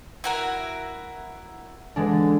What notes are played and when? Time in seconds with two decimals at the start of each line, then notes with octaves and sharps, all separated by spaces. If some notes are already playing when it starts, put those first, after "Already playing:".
0.24 E4 F#4 A#4
1.96 D3 E3 G#3 D4